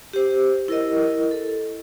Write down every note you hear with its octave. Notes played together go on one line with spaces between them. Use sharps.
G4 C5
E4 A#4 D#5
A4